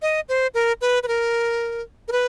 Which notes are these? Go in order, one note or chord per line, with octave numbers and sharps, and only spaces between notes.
D#5
C5
A#4
B4
B4
A#4
A#4
B4